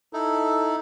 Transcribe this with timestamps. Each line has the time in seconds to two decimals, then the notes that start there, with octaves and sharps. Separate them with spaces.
0.13 D#4 E4 A4